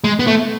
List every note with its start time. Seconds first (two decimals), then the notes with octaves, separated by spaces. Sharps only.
0.04 G#3
0.19 B3
0.27 A3